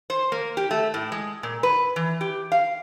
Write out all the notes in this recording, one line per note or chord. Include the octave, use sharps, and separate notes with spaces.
C5
A#3
G4
A3
A2
G#3
A#2
B4
E3
G4
F5